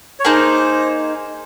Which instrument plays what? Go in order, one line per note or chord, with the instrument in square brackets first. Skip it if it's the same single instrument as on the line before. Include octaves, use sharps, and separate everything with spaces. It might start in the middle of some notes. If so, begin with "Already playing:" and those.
[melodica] C#5
[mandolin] A#3 D#4 G#4 [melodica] C5